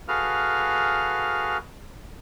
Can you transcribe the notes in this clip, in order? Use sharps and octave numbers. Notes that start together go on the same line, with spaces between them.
F#4 G#4 A4 B4 F5 F6